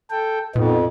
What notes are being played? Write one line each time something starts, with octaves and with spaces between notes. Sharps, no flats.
A4 G5
F2 A#2 B3 D#4